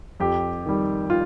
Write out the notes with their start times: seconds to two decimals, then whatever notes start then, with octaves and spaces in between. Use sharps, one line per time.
0.20 F2 G4
0.66 D#3 G3
1.10 F4